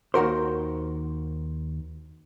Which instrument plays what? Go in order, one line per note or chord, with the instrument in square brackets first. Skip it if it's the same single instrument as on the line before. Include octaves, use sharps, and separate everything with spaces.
[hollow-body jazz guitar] D#2 D#3 F#4 A#4 C5